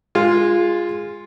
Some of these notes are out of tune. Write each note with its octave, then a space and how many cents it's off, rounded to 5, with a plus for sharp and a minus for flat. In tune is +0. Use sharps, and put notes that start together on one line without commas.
G#3 -10 F4 +0